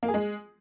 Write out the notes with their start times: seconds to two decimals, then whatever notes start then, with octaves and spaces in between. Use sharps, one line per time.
0.03 A#3
0.08 G#4
0.14 G#3